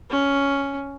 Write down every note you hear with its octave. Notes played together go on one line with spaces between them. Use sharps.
C#4